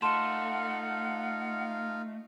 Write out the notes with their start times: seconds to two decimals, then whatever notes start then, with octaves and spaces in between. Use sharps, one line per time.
0.02 A3 D#4 F4 F5 F#5 A5 C6 E7